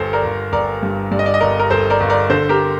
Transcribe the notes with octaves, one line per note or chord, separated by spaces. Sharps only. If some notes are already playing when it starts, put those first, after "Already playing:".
Already playing: G1 A4 C5
A#4 D5
G1
G1 A#4 D5
G2
G2 D5
D#5
D5
D#5
G1 A#4 D5
A#4
G1 A4 C5
A#4 D5
G1
A#4 D5
D3 A4 C5
G4 A#4